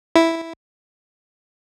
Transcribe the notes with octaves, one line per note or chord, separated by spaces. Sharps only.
E4